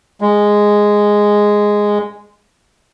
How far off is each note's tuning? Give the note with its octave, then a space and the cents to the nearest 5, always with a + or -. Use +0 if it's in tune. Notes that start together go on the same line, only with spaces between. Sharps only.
G#3 -5